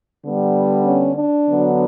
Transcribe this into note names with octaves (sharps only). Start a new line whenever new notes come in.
D3 G3 B3
C#4
D4
D3 F#3 B3